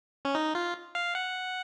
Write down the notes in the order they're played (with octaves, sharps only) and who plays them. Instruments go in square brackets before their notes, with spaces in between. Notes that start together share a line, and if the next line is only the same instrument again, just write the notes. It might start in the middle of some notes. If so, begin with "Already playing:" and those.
[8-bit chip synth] C#4
D#4
F4
F5
F#5